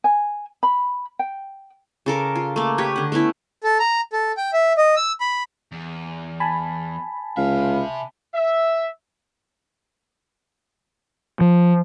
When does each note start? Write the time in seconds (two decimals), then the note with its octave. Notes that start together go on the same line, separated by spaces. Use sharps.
0.04 G#5
0.63 B5
1.19 G5
2.06 C#3 A4 A#4 D6
2.35 F4
2.56 A3 A#3
2.78 G4 B4 C#5
2.96 D3 F#5
3.12 A3 B3 C#4 E4
3.64 A4
3.79 A#5
4.13 A4
4.37 G5
4.53 E5
4.77 D#5
4.97 E6
5.20 B5
5.72 E2
6.40 G#5 A5 B5
7.37 C#2 C3 E5 F5
8.34 E5
11.41 F3